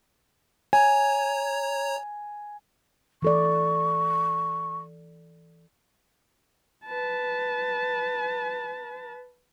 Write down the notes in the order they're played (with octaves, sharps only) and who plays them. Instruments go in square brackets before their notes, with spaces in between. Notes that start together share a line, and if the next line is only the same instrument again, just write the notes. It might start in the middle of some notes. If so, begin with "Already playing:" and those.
[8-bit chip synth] C#5 A#5 [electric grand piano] G#5
[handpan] E3 A4 D5 [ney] C#6
[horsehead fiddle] B4 A5